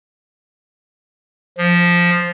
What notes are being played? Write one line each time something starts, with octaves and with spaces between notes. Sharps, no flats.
F3